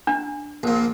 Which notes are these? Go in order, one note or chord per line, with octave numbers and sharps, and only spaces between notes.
D4
A#1 A#2